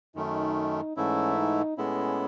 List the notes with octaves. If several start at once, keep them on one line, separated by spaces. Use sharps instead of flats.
F#2 D#3 A3 D#4
G#2 E3 A3 C#4 E4
D#4
A2 G#3 B3 C#4 E4